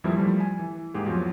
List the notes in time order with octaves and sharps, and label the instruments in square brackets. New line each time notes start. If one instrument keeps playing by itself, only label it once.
[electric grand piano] F2 E3 F3 G3 A#3 E4
F3 G3 A3
G#5
E3
G#2 A#3 G4 G#4
E2 F3 F#3